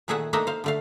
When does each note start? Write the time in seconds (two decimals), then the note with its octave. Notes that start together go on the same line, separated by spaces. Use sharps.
0.08 A#2 D#3 A3 G#4 E5 F#5
0.33 A3 A#3 D4 D#4 D#5 E5
0.47 C5 F5
0.64 D3 A3 F5